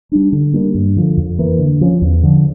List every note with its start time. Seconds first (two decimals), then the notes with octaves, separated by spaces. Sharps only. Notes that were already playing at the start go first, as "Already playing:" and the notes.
0.12 G3 D4
0.32 D3
0.53 G3 A#3 D4
0.75 G2
0.96 D3 F3
1.17 F2
1.39 E3 A#3
1.59 D3
1.81 F3 C#4
2.02 E2
2.23 D3 F3